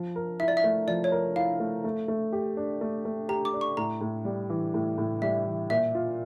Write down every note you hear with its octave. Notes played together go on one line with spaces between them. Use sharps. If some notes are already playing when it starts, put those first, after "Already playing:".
Already playing: F3
A#4
E4 E5
D5
E5
A3
F3 D5
C#5
A#4
E4 F5
A3
A3
A3
G4
D4
A3
A3
G4 A#5
D6
D4
C#6
A2 A#5
A2
G3
E3
A2
A2
G3 E5
E3
A#2 E5
F4